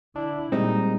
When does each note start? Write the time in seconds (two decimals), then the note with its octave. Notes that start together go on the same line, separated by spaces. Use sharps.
0.16 D3 D4 E4
0.52 A#2 G3 G#3 C4 D#4